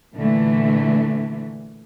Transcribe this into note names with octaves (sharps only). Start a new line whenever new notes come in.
A#2 D3 E3 A3